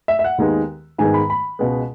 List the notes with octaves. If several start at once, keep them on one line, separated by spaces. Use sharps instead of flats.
E5
E5
F#5
D#2 D#3 G#3 B3 D#4
G#2 D#3 G#3 B3 D#4 G#5
B5
B5
C#2 B2 G#3 B3